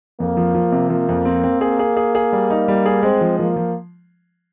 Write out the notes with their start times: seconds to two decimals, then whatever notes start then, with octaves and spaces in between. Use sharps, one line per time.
0.20 F2 A#3
0.37 F3
0.55 F3
0.72 C3
0.90 F3 A#3
1.09 F2
1.25 C4
1.44 C4
1.61 A#3 G#4
1.79 G#4
1.97 G#4
2.15 G#4
2.33 G3
2.50 D#4
2.68 G3
2.86 G#4
3.03 G#3 C4
3.21 F3
3.39 F3 A#3
3.56 F3